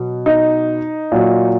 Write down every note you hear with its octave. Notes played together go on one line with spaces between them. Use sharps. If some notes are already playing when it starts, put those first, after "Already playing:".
Already playing: B2 F#3
D#4
A#2 F#3